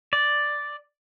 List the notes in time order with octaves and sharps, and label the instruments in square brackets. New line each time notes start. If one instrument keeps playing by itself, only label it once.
[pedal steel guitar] D5